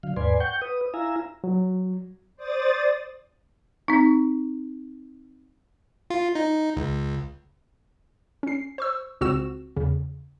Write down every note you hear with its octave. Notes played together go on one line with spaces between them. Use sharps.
D3 F#3 F5
D#2 G#2 B4 D5 G#5 C6
F#5 G5 C#6 G6
B4 D#6
E4 F5 G#5 A#5 E6
F#3
C5 D5 D#6 A6
C4 D#4
F4
D#4
C#2
C#4 C7
C5 C#6 E6
C#2 C#3 C4 F#4 E6 E7
E2 C#3